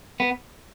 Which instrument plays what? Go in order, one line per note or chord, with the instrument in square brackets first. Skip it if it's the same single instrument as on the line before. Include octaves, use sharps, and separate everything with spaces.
[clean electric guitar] B3